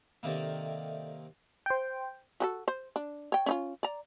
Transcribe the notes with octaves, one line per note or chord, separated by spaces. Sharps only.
C3 D#3 A#3 A4 D5 E5
C5 G5
F#4 G4 A4
C5
D4
C#5 G5
C#4 D#4 F4
D5 A#5